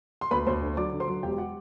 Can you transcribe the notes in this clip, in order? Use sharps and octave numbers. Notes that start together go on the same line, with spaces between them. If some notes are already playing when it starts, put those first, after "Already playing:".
C6
D2 B4 B5
D2 C5 C6
D3
F#3 D5 D6
D3
C5 C6
F#3
E1 G4 G5
F#4 F#5